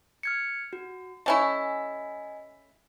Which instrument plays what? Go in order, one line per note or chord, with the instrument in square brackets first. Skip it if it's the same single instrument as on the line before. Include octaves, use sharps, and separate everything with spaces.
[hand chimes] F6 G#6 C#7
F#4
[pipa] A3 C#4 E4 [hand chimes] D#5 G#5